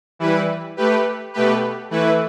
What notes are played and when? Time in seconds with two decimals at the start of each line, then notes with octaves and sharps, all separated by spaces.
0.19 E3 G3 E4 B4
0.77 A3 G4 B4
1.33 B2 A3 G4 B4
1.90 E3 A3 E4 B4